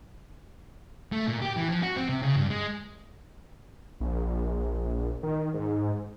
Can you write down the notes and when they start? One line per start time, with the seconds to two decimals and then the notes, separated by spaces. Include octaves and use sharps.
1.12 A3
1.28 A#2
1.42 G4
1.57 E3
1.70 F3
1.83 F#4
1.96 C4
2.09 C3
2.23 C#3
2.37 G2
2.50 G#3
4.00 A#1
5.23 D#3
5.54 G#2